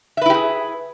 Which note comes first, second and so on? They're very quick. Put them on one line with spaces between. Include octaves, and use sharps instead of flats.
E5 B4 E4 G4 G#4